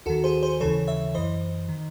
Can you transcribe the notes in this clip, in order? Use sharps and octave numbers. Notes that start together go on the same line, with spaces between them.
D#2 D#3 F#4 A4
G#4 C5
G#4 C5
D#2 C#3 E3 A4 C#5
C#5 E5
F#2 E3 C5 D#5
D#3